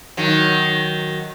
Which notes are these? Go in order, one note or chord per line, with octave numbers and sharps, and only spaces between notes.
D#3 F#3